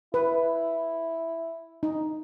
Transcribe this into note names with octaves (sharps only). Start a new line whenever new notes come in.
E4 B4
D#4